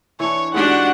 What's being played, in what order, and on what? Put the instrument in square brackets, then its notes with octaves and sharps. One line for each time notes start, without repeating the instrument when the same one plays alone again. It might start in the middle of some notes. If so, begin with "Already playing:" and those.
[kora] E3 D4 [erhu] C#5 [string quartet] C#6
[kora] G#2 [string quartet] G#3 F#4 [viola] D4 G4 [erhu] F#5